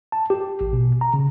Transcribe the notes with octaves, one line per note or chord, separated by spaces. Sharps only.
A5
G4
A1
B2
A#5
C#3